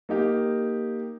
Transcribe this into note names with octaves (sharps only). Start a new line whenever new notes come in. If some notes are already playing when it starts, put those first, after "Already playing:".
A#3 D#4 G4